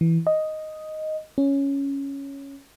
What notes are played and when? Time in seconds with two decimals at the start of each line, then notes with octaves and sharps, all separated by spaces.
0.01 E3
0.27 D#5
1.38 C#4